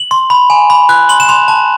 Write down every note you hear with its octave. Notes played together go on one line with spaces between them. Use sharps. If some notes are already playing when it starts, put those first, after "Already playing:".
Already playing: F#7
C6
B5
G#5
B5
F#6
C6 F#7
E7
C6 F7
A5